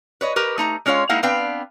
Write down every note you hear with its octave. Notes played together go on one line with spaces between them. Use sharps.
B4 C#5 D#5
G4 A#4 B4
A3 D#4 A#5
G#3 C#4 F4 C#5 F5
G#3 A#3 D#4 E4 F5 F#5
B3 C4 D4 B4 F5 G5